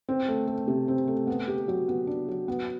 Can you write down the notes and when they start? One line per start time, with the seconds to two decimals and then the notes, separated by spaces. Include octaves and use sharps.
0.09 C4
0.28 A3
0.47 A3
0.68 C3
0.88 C4
1.08 A3
1.27 B3
1.48 G4
1.68 F#3
1.88 B3
2.07 D4
2.28 F#3
2.48 B3